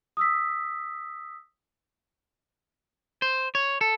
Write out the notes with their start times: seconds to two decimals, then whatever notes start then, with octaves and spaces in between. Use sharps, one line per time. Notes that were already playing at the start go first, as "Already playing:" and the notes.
0.17 D#6 E6 B6
3.22 C5
3.55 C#5
3.81 A4